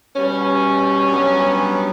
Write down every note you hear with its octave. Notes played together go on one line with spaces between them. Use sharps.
B2 G3 B3 C#4
G2 F#3 B3